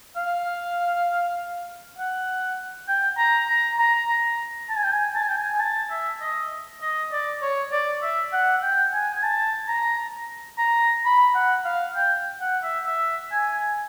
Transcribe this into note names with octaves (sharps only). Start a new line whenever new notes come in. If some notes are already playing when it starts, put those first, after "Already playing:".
F5
F#5
G5
A#5
A#5
A#5
A#5
A5
G#5
G5
G#5
A5
G#5
G5
G#5
G#5
A5
E5
D#5
D#5
D5
C#5
D5
E5
F#5
F#5
G5
G#5
G#5
A5
A#5
A#5
B5
F#5
F5
G5
F#5
E5
E5
G#5